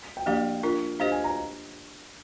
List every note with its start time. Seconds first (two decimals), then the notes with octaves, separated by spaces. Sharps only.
0.17 G5
0.26 F3 A#3 D4 G4 D5 F5
0.63 D4 F4 A#4
1.00 D4 G4 C5 D#5 F5
1.12 G#5
1.24 A#5